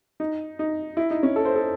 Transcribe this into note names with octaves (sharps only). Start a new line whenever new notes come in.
D#4
D#4
E4
D#4
C#4
A4
C5
A4